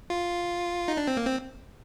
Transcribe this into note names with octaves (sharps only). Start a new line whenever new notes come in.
F4
D#4
D4
C4
A#3
C4